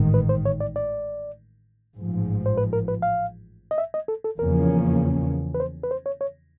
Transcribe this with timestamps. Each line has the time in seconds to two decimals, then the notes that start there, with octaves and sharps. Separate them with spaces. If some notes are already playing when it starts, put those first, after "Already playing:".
Already playing: A1 G#2 D#3
0.14 B4
0.29 C5
0.45 C#5
0.60 D5
0.76 D5
1.97 A1 G#2 F3
2.46 C5
2.58 B4
2.73 A#4
2.88 B4
3.02 F5
3.71 D#5
3.78 E5
3.94 D#5
4.08 A4
4.24 A4
4.39 E2 C#3 F3 A#3 C#4 A#4
5.54 B4
5.60 C5
5.83 B4
5.91 C5
6.06 C#5
6.21 C#5